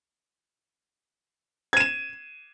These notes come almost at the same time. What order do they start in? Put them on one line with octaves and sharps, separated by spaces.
G#6 D#7 E7